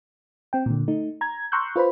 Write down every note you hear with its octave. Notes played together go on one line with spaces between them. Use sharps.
C4 G5
A#2 D3
A3 D#4
A#5 G#6
A#5 C6 C#6 E6 F#6 G6
F4 B4 C5 B5